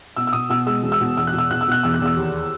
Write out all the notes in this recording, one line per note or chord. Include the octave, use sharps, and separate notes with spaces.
B2 E6
E6
B2 D#6
B2 E6
G#3 E6
E1
E6
B2
E2 E6
F#6
B2
E6
B2 F#6
E6
B2 F#6
E2 E6
F#6
E2 E6
D#2